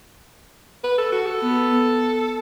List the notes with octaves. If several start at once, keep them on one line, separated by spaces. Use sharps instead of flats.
B4
A4
F#4
A4
B3